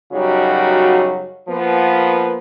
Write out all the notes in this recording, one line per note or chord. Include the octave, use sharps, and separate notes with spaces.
F#2 C#3 F#3 G3 D#4 F#4
F3 A#3 B3